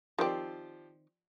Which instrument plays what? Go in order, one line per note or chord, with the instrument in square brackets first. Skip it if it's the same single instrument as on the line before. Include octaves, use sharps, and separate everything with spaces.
[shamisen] D#3 C4 [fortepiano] F3 G4 D5